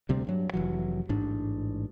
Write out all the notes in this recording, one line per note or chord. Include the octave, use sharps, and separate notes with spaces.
D2 C3 G3 C4
G2 F#3
F1 E3 F#3
A1 G#2 D4